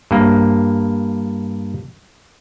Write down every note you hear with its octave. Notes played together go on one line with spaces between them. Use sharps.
G2 A#3